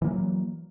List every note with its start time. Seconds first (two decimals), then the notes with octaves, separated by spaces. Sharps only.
0.02 E3
0.04 A#3
0.07 F#3